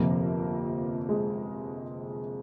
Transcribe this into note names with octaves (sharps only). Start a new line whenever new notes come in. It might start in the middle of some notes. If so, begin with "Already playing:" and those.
Already playing: G1 F2 C3 F3 A#3
G#3